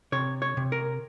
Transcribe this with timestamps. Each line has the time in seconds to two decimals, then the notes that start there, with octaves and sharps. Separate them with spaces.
0.12 C3 C#5
0.42 C#5
0.57 C3
0.72 A#4